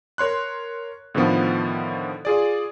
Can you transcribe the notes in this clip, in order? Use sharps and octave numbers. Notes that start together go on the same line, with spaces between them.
A#4 C#5 C6 F#6
A2 D3 D#3 F3 B3 F4
F4 G#4 D5